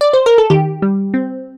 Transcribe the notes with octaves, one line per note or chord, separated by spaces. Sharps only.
D5
C5
A#4
A4
D#3 G4
G3
C4